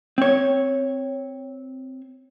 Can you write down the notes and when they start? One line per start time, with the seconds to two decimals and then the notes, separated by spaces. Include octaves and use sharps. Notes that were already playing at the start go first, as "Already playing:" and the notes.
0.18 C4 C#5